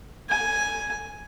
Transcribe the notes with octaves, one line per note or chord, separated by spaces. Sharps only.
G#5